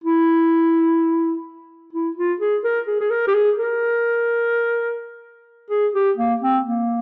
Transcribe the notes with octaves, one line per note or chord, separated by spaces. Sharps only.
E4
E4
F4
G#4
A#4
G#4
G#4
A#4
G4
G#4
A#4
G#4
G4
A#3
C4
A#3